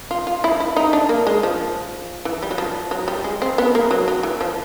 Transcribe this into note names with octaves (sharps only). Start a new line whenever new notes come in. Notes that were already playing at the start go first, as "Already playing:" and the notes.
F4
F4
E4
E4
D#4
D4
A#3
G#3
F3
E3
G3
F#3
F3
F#3
G3
G#3
C4
B3
A#3
F#3
F#3
E3
F3